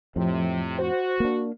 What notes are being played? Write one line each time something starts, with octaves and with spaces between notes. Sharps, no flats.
F2 A2 C3 F3
F#4 C5
A#3 D4